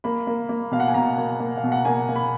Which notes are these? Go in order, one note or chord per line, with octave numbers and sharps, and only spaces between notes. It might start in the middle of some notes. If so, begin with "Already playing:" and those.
A#3 B5
A#3
A#3
B2 F5
F#5
G#5
B2 A#5
A#3
A#3
F5
B2
F#5
A#3 G#5
A#3
B5